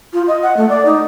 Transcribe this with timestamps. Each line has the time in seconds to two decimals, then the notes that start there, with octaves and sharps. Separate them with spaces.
0.13 F4
0.28 D#5
0.43 F#5
0.57 A3
0.69 D5
0.85 D#4